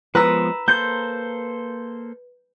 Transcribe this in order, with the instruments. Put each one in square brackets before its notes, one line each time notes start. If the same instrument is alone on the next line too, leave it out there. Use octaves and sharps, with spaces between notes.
[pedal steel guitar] F3 G#3 B3 [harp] B4 A#5 E6
[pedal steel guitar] A#3 A4 C5 [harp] G6